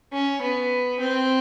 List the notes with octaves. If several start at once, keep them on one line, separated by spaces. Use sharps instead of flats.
C#4
B3
C4